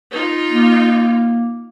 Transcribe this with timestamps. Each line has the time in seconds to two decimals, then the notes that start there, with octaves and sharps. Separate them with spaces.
0.12 D#4 F4
0.51 A#3